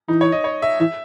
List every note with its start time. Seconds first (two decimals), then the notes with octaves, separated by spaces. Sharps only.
0.08 E3 D#4
0.21 C#5
0.32 D#5
0.44 C#5
0.62 E5
0.80 E3 E5